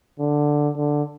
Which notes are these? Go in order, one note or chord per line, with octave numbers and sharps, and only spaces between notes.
D3
D3